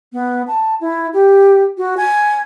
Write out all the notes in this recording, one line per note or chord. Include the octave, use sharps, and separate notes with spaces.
B3
A5
E4
G4
F#4
G#5